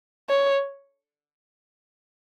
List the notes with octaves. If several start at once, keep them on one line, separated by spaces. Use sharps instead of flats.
C#5